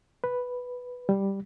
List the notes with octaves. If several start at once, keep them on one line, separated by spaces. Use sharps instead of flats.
B4
G3